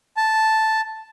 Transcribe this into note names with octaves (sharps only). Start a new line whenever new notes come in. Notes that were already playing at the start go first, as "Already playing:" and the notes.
A5